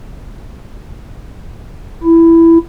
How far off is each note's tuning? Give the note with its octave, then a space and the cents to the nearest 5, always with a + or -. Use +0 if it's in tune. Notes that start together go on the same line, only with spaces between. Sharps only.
E4 +10